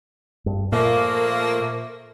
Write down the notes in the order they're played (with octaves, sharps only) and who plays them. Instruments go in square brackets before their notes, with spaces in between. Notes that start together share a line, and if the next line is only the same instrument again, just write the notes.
[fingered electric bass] G2
[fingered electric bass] A#2 [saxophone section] F3 A3 A#3